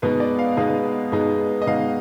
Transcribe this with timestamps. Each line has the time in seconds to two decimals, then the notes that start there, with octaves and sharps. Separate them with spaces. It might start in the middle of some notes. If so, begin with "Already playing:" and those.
0.02 B2 G#3 B3 D#4 B4
0.20 D5
0.39 F5
0.57 B2 G#3 B3 D#4 F5
1.12 B2 G#3 B3 D#4
1.62 D#5
1.66 B2 G#3 B3 D#4 F5